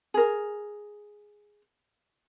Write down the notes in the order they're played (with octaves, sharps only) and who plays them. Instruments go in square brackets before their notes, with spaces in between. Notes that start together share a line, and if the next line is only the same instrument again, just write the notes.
[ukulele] G#4 A#4